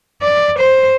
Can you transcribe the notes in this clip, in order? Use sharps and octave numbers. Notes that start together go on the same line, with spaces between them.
D5
C5